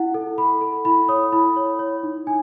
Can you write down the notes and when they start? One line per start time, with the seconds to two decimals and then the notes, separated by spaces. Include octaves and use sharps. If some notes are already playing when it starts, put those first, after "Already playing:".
Already playing: E4 F#5
0.14 A4
0.38 A4 B5
0.61 A4
0.85 E4 B5
1.09 C#5 D#6
1.32 E4 B5
1.56 C#5
1.79 C#5
2.03 D#4
2.27 D#4 G#5